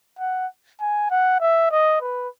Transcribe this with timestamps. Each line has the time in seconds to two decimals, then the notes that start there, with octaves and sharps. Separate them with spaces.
0.19 F#5
0.81 G#5
1.11 F#5
1.41 E5
1.71 D#5
2.01 B4